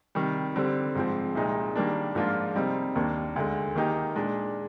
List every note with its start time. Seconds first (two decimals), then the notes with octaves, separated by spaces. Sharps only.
0.15 C3 D#3 G3
0.55 D3 G3 C4 G4
0.95 G#2 F3 C4
1.35 C2 A#2 G#3 D#4
1.75 D#3 G3 A#3 D4
2.15 G#2 F3 A#3 D4 F4
2.55 C3 G3 C4 D#4
2.96 D#2 D#3 A#3 D4
3.36 D2 D3 G#3
3.75 D#3 A#3 D#4 G4
4.16 A#2 G#3 D4